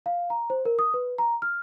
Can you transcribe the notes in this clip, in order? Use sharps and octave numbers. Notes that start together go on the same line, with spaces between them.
F5
A#5
C5
A#4
D#6
B4
A#5
F6